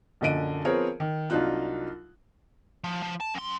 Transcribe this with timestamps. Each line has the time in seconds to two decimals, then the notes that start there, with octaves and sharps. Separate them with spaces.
0.21 A#1 F#2 D3 D#5 D7 D#7
0.64 F3 B3 C4 G#4 A#4 C#5
1.00 D#3
1.30 C2 F#3 D4 D#4 F4 F#6
2.84 F3
3.02 F3
3.20 A5
3.35 F#2 C6